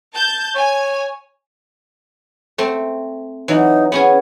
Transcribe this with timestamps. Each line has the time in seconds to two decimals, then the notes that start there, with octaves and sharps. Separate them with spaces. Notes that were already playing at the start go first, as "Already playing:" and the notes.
0.14 A5 G6
0.55 C#5 G#5
2.58 A3 C4
3.48 E3 F#3 D#4
3.92 B3 C#4 G#4 C#5